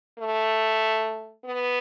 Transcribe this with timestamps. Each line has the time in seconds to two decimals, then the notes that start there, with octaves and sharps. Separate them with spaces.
0.19 A3
1.45 B3